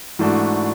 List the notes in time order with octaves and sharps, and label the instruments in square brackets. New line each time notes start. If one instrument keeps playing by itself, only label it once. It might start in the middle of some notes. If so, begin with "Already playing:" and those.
[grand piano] G#2 E3 A3 D4 F#4